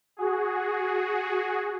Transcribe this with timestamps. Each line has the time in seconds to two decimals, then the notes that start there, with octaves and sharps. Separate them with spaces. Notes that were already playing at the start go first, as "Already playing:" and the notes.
0.17 F#4 G#4